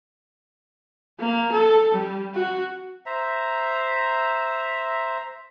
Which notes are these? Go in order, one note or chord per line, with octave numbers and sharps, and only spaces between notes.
A#3
A4
G3
F#4
C5 E5 A#5